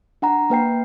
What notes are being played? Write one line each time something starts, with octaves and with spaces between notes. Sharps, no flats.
D4 F#5 A#5
A#3 B4 G5 C7